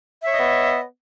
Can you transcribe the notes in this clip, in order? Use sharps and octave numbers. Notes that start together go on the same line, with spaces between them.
B3 C#5 D#5 E5